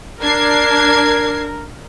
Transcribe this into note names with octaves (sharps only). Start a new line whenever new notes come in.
D4 A#4 G#6 C7